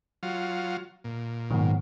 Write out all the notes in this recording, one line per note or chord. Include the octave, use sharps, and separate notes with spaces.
F#3 F4
A#2
G#2 C3 D#3 F#3 B3